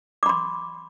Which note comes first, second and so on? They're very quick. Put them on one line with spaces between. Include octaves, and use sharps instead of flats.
D6 B5 C6